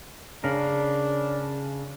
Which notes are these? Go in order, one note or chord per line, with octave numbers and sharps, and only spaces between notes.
C#3 D4 A#4